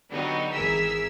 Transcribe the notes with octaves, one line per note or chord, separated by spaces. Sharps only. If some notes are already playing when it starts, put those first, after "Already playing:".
D3 F#3 G3 B3 D#4
G#1 E3 G#4 A#4 E6 B6